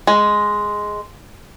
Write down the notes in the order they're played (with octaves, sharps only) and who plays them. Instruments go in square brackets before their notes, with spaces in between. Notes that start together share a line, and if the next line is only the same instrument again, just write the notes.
[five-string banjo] G#3